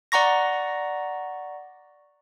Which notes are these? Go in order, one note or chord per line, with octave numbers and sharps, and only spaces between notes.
D5 F#5 A#5 C#6 A#6